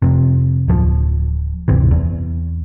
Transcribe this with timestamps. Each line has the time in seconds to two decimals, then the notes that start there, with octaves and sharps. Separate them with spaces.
0.02 F2 C3
0.68 D1 F3
1.68 D1 G1 C3 E3
1.91 E2